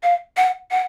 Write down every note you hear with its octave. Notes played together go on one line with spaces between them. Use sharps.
F5
F#5
F#5